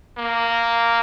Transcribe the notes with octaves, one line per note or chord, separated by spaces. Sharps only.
A#3